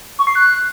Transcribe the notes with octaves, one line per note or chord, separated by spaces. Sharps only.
C#6
C7
F#6